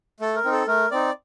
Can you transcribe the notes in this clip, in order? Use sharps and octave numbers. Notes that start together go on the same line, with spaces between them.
A3 A4
A#4
C4 D#4
A4
A3 A#4
C4 D#4 D5